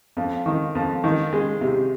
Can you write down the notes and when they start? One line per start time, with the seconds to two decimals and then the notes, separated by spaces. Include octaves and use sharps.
0.17 F2
0.46 D#3
0.75 F2
1.04 D#3
1.33 G#3
1.61 C3